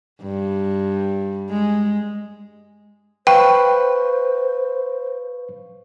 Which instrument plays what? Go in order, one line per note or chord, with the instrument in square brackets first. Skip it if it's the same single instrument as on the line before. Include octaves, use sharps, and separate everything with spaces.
[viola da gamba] G2
G#3
[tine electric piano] B4 F5 C#6 [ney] C5 [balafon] G5